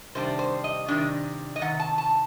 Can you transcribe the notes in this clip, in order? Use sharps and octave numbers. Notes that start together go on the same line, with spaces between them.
C3 D#3 G3 D4 C5
C5
D#5
C3 D#3 G3 D4
D#5
C3 D#3 F#5
A5
A5